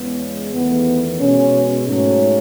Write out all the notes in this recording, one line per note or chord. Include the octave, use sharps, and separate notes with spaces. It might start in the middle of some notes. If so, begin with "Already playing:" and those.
Already playing: E2 C#3 G#3 B3
E2 D#3 A3 B3
B2 G#3 C#4
G#2 F#3 A3 C#4